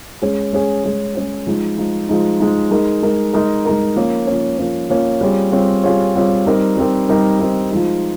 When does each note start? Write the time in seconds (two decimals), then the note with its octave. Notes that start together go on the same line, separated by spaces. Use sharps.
0.22 G#3 C#4 G#4
0.53 G#3 C#4 G#4
0.84 G#3 C#4 G#4
1.15 G#3 C#4 G#4
1.47 F3 G#3 D#4
1.78 F3 G#3 D#4
2.09 F3 G#3 D#4
2.40 F3 G#3 D#4
2.71 G#3 D#4 A#4
3.02 G#3 D#4 A#4
3.34 G#3 D#4 A#4
3.65 G#3 D#4 A#4
3.96 F3 A#3 C#4
4.27 F3 A#3 C#4
4.59 F3 A#3 C#4
4.90 F3 A#3 C#4
5.21 G3 C4 F4 G#4 C#5
5.52 G3 C4 F4 G#4 C#5
5.84 G3 C4 F4 G#4 C#5
6.15 G3 C4 F4 G#4 C#5
6.46 G3 C4 D#4 A#4
6.77 G3 C4 D#4 A#4
7.09 G3 C4 D#4 A#4
7.39 G3 C4 D#4 A#4
7.71 F3 G#3 D#4